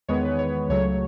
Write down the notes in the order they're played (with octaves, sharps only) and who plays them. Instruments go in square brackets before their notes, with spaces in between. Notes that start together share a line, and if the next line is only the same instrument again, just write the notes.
[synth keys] E2 D#3 G#3 B3 C#5
B4
C#5
C#2 C#3 F#3 A3 C#5